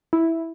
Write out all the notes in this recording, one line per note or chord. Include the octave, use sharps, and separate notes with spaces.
E4